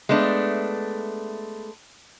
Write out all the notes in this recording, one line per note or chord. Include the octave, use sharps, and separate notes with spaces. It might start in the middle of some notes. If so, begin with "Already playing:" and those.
G#3 A3 B3 D4